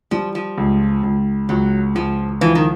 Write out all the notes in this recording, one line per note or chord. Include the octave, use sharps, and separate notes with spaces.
F3 G3
F3
C#2
C#2
C#2 F#3
C#2 F3
E3 F3
D#3